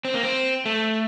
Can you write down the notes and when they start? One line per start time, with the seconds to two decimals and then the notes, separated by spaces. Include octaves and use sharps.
0.05 C4
0.14 A#3
0.23 C4
0.66 A3